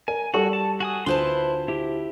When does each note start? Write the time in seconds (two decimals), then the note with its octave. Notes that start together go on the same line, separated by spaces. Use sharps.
0.08 A#4 G#5
0.34 G3 F#4 A4 C#6
0.53 A5
0.80 F#4 G#5 D#6
1.06 D2 E4 F4 B4 C5 A5 C6
1.68 E4 G4